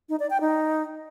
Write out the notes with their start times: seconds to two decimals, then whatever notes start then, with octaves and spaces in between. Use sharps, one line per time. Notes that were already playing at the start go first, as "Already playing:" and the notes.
0.09 D#4
0.20 D5
0.30 G5
0.41 D#4